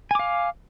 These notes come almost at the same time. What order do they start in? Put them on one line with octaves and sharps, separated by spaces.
G#5 D6 F5